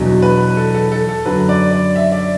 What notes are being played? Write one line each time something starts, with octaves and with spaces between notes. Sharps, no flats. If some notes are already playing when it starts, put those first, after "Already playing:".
Already playing: E2 B2 F#3 D4
B4
A4
A4
A4
A4
F#2 D3 F#3 B4
D5
D5
E5
D5